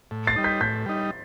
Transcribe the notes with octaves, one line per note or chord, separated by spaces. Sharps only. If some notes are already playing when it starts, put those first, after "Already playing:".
A2
A6 C7
G3 D#4
G6 B6
A2 G6 B6
G3 D#4